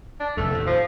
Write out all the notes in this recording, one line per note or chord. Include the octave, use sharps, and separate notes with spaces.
D4
F1 E2 A3
D#2 A2
F3